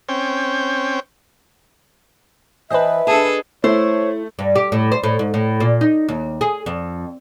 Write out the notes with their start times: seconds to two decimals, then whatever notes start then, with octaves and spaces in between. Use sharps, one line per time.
0.09 C4 C#4 G5
2.70 E3 B4 C5 D#5 E5 A5
3.07 D4 G#4 A4 A5
3.64 A3 E4 C5 C#5
4.39 G2
4.56 G4
4.72 A2
4.92 C5
5.04 A2
5.19 G#2
5.34 A2
5.60 A#2
5.81 D#4
6.09 D#2
6.41 G#4
6.66 F2